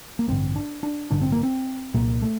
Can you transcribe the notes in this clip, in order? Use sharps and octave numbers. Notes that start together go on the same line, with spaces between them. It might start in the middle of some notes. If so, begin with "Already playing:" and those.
A#3
A1 G2 D3 C4
D4
D4
A1 G2 D3 D4
C4
A#3
C4
C2 A#2 A#3
A3